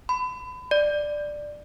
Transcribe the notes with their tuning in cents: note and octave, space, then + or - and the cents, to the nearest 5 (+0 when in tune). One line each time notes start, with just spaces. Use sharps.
B5 +35
D5 +10